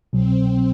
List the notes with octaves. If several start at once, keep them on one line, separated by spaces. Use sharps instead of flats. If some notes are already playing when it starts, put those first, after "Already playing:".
C2 B2 F#3 C4